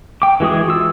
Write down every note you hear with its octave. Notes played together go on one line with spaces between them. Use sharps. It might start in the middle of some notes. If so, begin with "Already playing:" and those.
G5 D6
E3 G#3 F#4 G#4 D#6
F4 E6